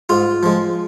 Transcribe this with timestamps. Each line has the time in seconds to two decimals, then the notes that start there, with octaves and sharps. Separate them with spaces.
0.09 G#2 F4
0.43 F3 G#3